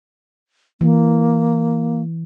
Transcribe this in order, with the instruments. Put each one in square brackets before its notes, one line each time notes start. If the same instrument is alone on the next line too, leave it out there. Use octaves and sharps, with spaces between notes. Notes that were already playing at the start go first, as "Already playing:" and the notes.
[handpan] E3 [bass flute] A#3